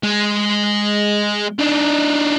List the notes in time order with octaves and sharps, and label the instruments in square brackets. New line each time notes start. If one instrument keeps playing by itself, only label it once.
[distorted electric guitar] G#3
D4 D#4